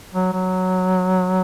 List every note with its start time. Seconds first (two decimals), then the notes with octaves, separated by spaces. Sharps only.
0.13 F#3
0.33 F#3